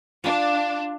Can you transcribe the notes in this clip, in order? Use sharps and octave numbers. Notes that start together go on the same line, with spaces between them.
D4 F4 F5